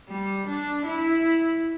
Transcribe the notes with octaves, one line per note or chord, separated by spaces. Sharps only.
G3
D4
E4